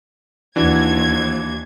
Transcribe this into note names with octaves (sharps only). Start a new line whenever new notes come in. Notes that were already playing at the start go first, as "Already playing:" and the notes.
D#2 E3 D4 F#4 G#6